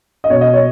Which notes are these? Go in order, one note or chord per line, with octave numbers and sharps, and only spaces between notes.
D#5
B2 C#5
D#5
C#5